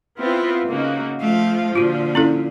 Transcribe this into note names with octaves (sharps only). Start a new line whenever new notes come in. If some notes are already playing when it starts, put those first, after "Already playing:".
B3 C4 E4 F4
C#3 A#3 D#4 F#4
F3 A3 F5
A#2 D3 F4 F#4
C#4 E4 A4